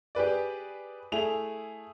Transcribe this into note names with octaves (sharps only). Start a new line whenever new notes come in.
G4 G#4 B4 D5
A3 E4 G#4 F7